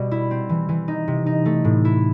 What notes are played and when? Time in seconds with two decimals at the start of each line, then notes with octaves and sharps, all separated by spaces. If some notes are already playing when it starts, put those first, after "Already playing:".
Already playing: B2 G3
0.11 E4
0.31 C4
0.49 E3
0.69 E3
0.88 D#4
1.08 C3
1.26 D#4
1.45 A3
1.65 A2
1.85 E4